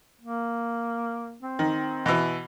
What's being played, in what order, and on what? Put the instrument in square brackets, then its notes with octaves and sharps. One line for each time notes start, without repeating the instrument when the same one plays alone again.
[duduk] A#3
C4
[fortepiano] D#3
B2 E3